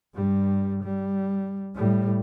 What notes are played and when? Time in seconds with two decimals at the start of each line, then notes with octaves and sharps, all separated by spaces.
0.15 G2 G3
0.83 G3
1.75 A2 G3